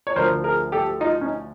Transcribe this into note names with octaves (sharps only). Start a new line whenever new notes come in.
C#5
D2 D3 F3 A#4 C5
G#4 A#4
G4 A4
D#4 F4
C#4 D#4